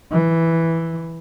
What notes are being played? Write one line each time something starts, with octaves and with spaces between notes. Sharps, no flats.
E3